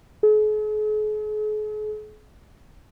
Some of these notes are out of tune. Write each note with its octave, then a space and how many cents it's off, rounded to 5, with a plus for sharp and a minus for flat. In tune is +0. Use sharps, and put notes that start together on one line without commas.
G#4 +45